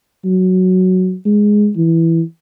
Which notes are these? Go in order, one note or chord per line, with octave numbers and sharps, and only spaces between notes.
F#3
G#3
E3